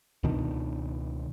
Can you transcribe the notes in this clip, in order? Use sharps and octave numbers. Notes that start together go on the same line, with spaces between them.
C#2 B2 D#3 D4